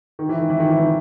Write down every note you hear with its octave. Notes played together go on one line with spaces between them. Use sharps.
D#3
E3
D#3
E3
D#3
E3
D#3